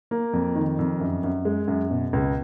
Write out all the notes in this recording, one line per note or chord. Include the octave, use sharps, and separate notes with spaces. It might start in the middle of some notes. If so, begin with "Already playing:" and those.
A#3
F2
D#3
F2
F#2
F#2
G#3
F#2
B2
C#2